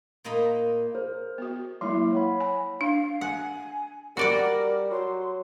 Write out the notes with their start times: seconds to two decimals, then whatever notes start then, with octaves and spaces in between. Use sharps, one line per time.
0.24 A#2 A#3 D#4 D#5 B5
0.95 G#4 A#4 C5
1.38 B3 F#4
1.81 F#3 G#3 A#3 E4 C6
2.12 C#5 F#5 B5
2.40 G#5
2.81 D4 F5
3.21 F#5 G#5
4.17 G3 F#4 A#4 D5 F#5
4.91 F#3 C6